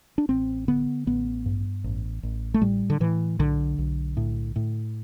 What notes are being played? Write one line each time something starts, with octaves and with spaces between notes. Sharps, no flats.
D4
A1 C4
D3 B3
A1 B3
G2
A1
A1
A3
A2 G3
D3
A2 E3
B1 D3
B1
A2
A2